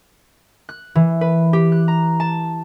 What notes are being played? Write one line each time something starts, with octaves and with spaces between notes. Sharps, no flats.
F#6
E3
B4
G4
F#6
A#5
A5